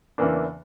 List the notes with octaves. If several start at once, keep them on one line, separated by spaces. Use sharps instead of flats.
E2 C#3 E3 A#3 D4